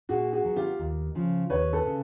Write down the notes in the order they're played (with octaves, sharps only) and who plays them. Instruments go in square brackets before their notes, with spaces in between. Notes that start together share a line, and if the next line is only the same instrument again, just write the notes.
[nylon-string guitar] A#2 [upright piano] F#4 G#4
[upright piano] F#4 G#4
[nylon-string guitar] F#3 B3
[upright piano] F4 G4
[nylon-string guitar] D#2
C#3 F3
[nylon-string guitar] D#2 [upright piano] B4 C#5
[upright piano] A4 B4
[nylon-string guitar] C#3